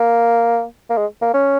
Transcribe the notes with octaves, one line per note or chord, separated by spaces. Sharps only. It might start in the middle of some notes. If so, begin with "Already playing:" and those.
Already playing: A#3
A#3
G#3
A#3
C#4